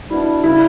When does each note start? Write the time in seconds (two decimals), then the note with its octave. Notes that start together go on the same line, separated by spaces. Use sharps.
0.10 B2 G3 D4 E4
0.44 C#3 G3 C#4 E4